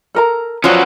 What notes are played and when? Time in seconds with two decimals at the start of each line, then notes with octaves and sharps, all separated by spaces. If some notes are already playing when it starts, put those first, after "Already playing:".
0.15 A4 A#4 A#5
0.64 F3 F#3 C#4 F#4 B4